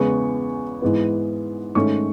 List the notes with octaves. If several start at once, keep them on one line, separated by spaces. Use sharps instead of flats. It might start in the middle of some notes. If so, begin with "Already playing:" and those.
Already playing: E2 C#3 G#3 B3 C#6
G#2 E3 B3
G#2 D#3 A3 C#4 C#6